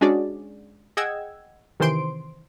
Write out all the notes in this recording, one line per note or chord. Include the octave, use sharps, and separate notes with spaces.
G#3 C#4 D4 F#4 G#4 D5
G#4 D#5 F#5 G5 E6 G#6
C3 D#3 E3 C5 C6 D7